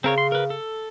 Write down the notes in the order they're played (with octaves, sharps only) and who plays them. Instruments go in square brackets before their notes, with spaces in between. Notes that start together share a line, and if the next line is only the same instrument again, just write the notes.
[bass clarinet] C#3 [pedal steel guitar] C4 A#4 C#5
[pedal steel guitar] C6
A#4 B4
A4